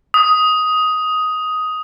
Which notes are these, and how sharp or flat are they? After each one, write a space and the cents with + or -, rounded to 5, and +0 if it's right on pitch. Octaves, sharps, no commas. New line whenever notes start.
D#6 +10